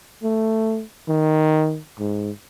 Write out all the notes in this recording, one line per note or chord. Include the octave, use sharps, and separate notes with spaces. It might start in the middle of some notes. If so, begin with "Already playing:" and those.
A3
D#3
G#2